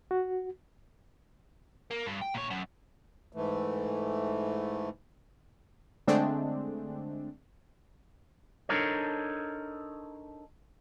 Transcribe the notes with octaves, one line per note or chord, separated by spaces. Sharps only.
F#4
A#3
G2
G5
A#2 C#5
F#2
G#2 E3 A3
D3 G#3 A3 C4 D4
D4 D#4 A4 A#4 C5 C#5